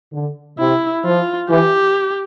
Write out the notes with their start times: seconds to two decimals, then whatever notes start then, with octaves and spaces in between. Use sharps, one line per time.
0.13 D3
0.59 C3 E4
1.05 F3 F4
1.50 E3 G4